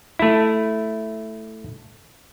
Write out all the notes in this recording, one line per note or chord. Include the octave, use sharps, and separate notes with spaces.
A3 E4